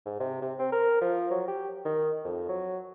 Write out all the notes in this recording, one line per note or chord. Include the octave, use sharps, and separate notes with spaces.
G#2
C3
C3
C4
A#4
F3
F#3
G4
D#3
F2
F#3